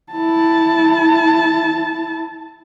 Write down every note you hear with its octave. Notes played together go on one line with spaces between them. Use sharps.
E4 A5